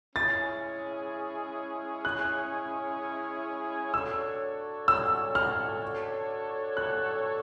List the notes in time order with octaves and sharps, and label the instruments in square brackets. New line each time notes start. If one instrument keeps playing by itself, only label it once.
[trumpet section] G#3 C#4 E4 G#4 C#5 [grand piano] A6
[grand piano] F#6
[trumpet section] D4 F#4 A4 C#5 [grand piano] E6
[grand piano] E6
F6
F#6